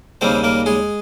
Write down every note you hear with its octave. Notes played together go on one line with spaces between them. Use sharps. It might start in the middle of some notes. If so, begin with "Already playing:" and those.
D#2 C#3 G3 A#3 C4 C5
A#3 A#4
G#3 G#4